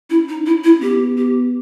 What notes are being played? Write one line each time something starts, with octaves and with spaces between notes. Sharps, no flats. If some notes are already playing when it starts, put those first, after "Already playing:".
C#4 E4
D#4
E4
E4
B3 G4
G4